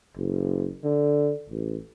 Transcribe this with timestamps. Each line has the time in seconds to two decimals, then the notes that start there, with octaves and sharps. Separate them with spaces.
0.17 F#1
0.84 D3
1.49 A1